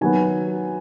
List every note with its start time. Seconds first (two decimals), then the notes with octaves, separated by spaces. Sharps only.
0.01 D#3 F#3 B3 G#5